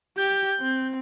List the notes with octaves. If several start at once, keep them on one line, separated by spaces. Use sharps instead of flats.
G4 G6
C4